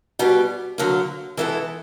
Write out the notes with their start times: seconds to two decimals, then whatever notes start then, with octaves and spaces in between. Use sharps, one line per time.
0.19 B2 G3 B3
0.78 D3 F#3 A#3
1.37 E3 G#3 B3 E4 A4